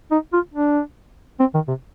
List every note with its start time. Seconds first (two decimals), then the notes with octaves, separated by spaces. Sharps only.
0.11 D#4
0.33 F4
0.54 D4
1.40 C4
1.54 D#3
1.68 C3